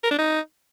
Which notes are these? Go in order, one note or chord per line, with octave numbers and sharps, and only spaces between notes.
A#4
D4
D#4